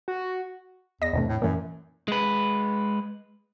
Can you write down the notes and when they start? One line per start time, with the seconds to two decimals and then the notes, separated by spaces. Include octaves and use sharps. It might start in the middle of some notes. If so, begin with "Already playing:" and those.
0.08 F#4
1.02 E2 D#5 A#6
1.13 E2 G2 C3 A3
1.28 A2
1.42 F#2 A#2 E3
2.08 G#3 B4